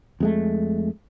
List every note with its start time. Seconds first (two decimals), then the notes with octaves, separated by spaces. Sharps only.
0.20 F2 G#3 A3